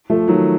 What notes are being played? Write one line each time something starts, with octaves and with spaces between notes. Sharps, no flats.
F3 A3
D#3 F#3